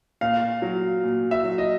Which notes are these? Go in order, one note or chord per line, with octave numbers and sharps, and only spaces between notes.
A#2 F5
F#3
A#2
E5
F#3
D#5